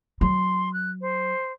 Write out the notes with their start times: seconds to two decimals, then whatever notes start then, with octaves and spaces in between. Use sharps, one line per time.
0.21 F#3 C6
0.73 F#6
1.01 C5